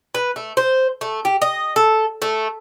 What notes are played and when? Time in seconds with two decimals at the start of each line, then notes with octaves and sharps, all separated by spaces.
0.15 B4
0.36 A3
0.57 C5
1.01 A3
1.25 G4
1.42 D#5
1.76 A4
2.22 A3